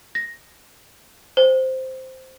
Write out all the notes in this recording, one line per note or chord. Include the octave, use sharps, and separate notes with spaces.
A#6
C5